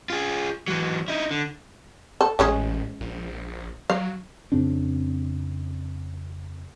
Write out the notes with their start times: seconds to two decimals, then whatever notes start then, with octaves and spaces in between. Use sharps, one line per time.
0.10 F4 G#4
0.68 E3 F#3
1.08 D#4 E4
1.31 D3
2.21 A4
2.39 A1 G#3 C#4 G#4
3.01 A#1
3.90 F#3 F5
4.52 F2 C#3 C4 D4